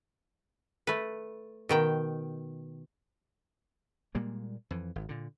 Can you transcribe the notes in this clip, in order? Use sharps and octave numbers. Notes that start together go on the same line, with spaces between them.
A3 B4
B2 D#3 G5
A#2 G3 G#3 A#3
F2 E3
G#1
A#2 D3